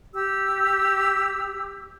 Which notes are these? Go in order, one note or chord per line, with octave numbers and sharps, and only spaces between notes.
G4 E6